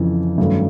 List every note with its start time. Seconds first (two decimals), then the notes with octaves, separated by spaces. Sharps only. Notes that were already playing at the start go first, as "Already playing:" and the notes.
Already playing: F2 C#3 E3
0.38 G2 D#3 F#3 A3 C#4